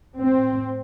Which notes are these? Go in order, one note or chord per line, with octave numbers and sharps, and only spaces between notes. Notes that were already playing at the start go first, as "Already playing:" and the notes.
A2 C4